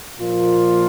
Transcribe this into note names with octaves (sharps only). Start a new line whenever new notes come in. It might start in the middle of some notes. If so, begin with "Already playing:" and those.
A#2 F3 A#3 F4